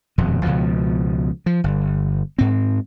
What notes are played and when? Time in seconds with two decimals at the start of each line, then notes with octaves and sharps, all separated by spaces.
0.18 D#1 F2 B2
0.43 C#2 B2 F3
1.46 F3
1.64 G1
2.38 G#2 C4